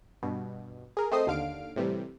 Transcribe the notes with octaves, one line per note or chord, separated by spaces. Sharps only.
G2 B2
G#4 A#4
A3 C4 C5 D#5 D#6 C7
D#2 D3 F5 F6 D7
A2 C3 E3 G3